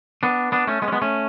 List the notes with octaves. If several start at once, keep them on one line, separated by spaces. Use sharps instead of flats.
B3 D4
B3 D4
A3 C#4
G#3 B3
C#4
G#3 B3
A3 C#4